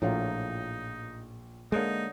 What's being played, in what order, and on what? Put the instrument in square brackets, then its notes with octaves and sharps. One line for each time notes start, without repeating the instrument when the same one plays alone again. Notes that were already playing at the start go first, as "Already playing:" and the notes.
[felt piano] A#1 [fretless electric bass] A2 [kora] F#3 A#3 F4 [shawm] D#4
[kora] D3 C#5 E5 [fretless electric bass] G#3 A#3 [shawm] D#4